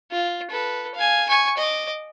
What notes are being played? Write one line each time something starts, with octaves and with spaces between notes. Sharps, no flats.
F4
A4 B4
F5 G#5
G#5 C#6
D#5 D6